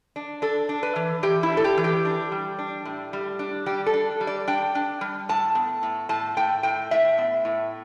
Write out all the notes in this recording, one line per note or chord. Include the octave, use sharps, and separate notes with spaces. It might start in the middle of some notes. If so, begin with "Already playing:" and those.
D4
D4 A4
D4
B4
E3
E3 G4
E4
D4
A4
G4
E3
G4
D4
G3
D4
A2
G3
D4
G3 G4
A4
D4
G3
D5
D4 G5
D4
G3
A2 A5
B3
A2
A2 A5
A2 G5
A2 G5
A2 E5
B3
A2